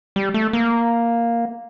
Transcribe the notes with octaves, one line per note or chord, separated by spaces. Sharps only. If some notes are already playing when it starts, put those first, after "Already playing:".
G3
A3
A#3